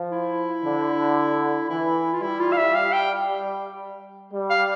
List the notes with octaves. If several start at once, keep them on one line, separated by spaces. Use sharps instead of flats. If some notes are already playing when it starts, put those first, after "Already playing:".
Already playing: F3
E4
D3
E3 E4
F4
G3 E4
F4
F5
E5
F5
G5
G3
F5